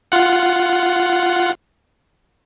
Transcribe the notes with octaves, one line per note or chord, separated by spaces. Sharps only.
F4 F#5